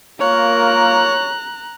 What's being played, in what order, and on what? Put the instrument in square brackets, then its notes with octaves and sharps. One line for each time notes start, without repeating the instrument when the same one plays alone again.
[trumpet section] A#3 F4 A#4 [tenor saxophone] C#5 [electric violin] A#5 F#6